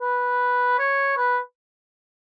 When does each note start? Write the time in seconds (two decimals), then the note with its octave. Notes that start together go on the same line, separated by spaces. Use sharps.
0.01 B4
0.79 C#5
1.17 B4